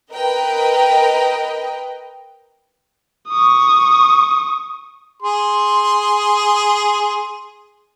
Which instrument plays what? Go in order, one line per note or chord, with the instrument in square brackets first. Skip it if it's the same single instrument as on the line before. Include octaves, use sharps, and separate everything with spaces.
[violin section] A#4 B4 D#5 G5
[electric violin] C#6 D#6
[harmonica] G#4 C6